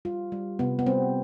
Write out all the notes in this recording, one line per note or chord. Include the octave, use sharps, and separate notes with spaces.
G3 F4
G3
C3 B3
B3
G3 C4